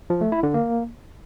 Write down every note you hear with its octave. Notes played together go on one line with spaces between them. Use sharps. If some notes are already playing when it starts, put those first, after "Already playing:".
F3
A3
E4
D3
A#3